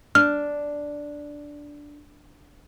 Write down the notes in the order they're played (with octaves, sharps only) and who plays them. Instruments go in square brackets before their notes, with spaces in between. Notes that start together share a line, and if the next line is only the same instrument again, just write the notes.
[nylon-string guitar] D4 [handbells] F6